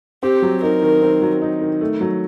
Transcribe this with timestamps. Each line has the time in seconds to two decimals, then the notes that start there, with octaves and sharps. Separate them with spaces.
0.23 C4 G4
0.42 F#3
0.62 D#4 A#4
0.82 D#3
1.02 C4
1.22 F#3
1.42 D#4
1.61 D#3
1.81 A3
2.01 F#3